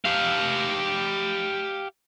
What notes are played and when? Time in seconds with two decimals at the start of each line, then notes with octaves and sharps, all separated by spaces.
0.05 G4 F5